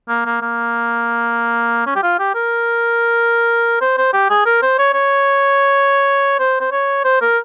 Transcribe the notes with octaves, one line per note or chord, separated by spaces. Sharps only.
A#3
A#3
A#3
C#4
G4
F4
G4
A#4
C5
C5
G4
G#4
A#4
C5
C#5
C#5
C5
C5
C#5
C5
A#4